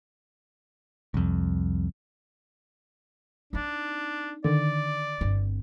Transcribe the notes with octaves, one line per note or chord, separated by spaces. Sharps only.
C2 F2
C4 D4 D#4
D3 D#3 D5
G1 C4